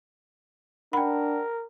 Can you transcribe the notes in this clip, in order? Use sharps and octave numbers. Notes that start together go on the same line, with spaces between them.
D4 A#4 F#5 G5 B5